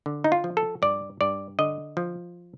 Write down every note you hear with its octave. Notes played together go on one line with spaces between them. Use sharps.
D3
D#4
F4
F3
A4
G2 D5
G2 D5
D3 D#5
F3